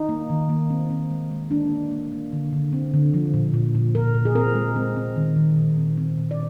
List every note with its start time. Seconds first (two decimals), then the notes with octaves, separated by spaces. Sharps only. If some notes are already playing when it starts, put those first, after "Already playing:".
Already playing: D#4
0.09 A#3
0.30 D#3
0.50 A#3
0.70 C4
0.90 C4
1.11 G#3
1.31 G#3
1.51 A#3 D4
1.72 A#3
1.91 A#3
2.12 A#3
2.33 D3
2.53 D3
2.73 C4
2.94 D3
3.14 F3
3.34 A#2
3.54 A#2
3.75 A#2
3.95 A#2 A#4
4.14 A#2
4.25 G#4
4.35 C4 A#4
4.55 G#3
4.76 C4
4.96 C4
5.16 D#3
5.36 D#3
5.57 A#2
5.78 C4
5.97 C4
6.18 A#2
6.31 D5